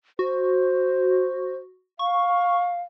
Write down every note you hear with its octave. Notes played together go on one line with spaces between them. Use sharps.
F#4 C5
F5 C#6